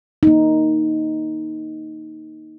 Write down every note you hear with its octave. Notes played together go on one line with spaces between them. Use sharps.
A#3 D#4